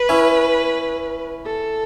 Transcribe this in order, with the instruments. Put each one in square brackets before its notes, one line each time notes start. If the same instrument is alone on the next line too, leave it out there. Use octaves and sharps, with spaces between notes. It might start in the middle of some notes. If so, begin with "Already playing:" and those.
Already playing: [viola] B4
[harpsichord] C#4 E4
[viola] A4